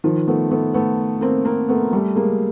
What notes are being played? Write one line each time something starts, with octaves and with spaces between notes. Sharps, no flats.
D#3 F3
A3 B3
A3 B3
A3 B3
A#3 C4
A#3 C4
A3 B3
G3 A3
G#3 A#3